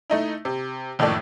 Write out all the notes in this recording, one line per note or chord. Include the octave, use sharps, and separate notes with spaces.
A3 D#4 E4
C3
F#1 F2 A2 D#3 A4 D5